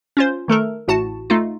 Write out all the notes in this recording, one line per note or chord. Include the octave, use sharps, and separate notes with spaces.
C#4 F4 C5
D#3 A3 A4 A#4
A1 A2 F#4 A5
A3 D#4 F4